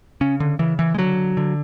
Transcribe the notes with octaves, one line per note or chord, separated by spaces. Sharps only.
C#3 C#4
D3
C#3 E3
E3
G#3
D3 F#3
D3